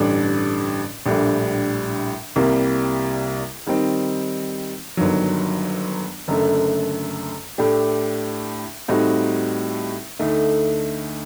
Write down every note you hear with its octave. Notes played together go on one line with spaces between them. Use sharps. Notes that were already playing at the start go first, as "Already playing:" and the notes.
Already playing: A1 G2 D3 G3 D4
A#1 A2 G3 D4
C2 C3 G3 A#3
D#3 G3 C4 D#4
G1 G2 D#3 F#3
F#1 F#2 D3 A3
A2 A3 D4 G4
A2 G3 C4 D#4 F#4
D2 D3 A3 D#4